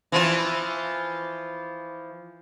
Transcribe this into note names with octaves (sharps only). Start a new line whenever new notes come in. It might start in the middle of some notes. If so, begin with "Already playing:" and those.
E3 F3 F4